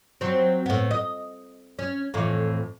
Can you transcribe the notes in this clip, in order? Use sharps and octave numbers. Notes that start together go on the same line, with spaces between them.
F#3 C4
A2 B3
D#5
C#4
F2 A2 E3